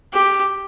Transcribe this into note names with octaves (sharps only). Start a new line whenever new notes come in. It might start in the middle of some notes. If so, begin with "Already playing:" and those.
G4